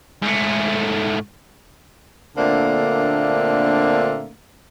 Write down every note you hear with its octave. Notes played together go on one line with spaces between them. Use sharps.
G#2 A3
A#2 D3 A3 A#3 C4 D4